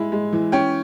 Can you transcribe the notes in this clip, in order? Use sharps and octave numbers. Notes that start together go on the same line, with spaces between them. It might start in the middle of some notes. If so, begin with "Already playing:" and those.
Already playing: G#3 E4
G#3
E3
C#4 G5